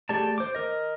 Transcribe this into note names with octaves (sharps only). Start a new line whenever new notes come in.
A3 G4 G#4 D5 A5
C5 D6
A#4 D#5